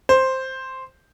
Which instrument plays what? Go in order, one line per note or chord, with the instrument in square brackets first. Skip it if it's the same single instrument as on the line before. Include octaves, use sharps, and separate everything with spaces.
[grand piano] C5